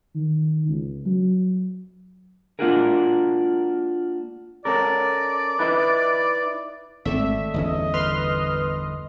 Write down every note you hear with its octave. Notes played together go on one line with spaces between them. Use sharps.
D#3
C#2
F#3
A#3 D4 F4 F#4 G#4 A#4
C#4 A4 A#4 D5
D#4 E4 B4
G#1 A3 C4 A4 D5 E5
G1 E2 C#4 D#5
B4 C6 F6